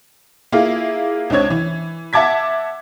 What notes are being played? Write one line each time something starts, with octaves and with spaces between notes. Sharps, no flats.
A#3 E4 F4 G#4 F5
C#2 C4 D4 C#5 G#6
E3
E5 F#5 A5 D6 G#6 B6